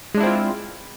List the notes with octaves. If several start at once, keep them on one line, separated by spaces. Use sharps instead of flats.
G#3 C4 D4 E4 F4